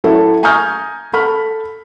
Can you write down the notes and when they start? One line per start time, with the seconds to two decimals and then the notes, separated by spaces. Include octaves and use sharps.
0.04 F#3 C#4 E4 A4
0.43 G#5 A#5 C#6 D#6 F6 G6
1.13 A4 B5 F6